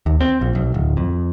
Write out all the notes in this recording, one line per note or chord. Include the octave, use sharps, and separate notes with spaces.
D#2
C4
A#1
B1
D1
F2